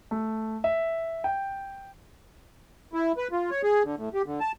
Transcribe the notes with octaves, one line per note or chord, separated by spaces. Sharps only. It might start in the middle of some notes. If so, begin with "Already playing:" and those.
A3
E5
G5
E4
B4
F4
C#5
G#4
D3
A2
G4
D3
A5